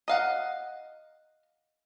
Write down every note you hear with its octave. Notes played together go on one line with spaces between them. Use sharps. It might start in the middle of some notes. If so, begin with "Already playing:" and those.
D#5 F5 F#5